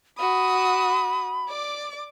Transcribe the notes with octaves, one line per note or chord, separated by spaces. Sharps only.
F#4 B5 D#6
D5 D6